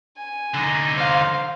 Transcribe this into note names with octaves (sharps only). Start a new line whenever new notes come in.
G#5
D3 D#4
C5 F5